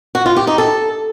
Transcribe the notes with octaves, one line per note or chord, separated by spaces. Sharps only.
F#4
F4
G4
D#4
A4